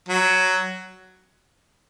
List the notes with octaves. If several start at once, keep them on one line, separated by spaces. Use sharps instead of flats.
F#3